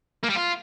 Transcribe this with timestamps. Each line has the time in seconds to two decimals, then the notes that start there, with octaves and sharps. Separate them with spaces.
0.23 A#3
0.29 G3
0.35 F4